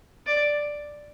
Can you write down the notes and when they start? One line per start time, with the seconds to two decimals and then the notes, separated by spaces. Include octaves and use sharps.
0.26 D5